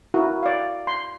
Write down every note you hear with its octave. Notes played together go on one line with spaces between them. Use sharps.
E4 F#4 A#4
D5 F5
C6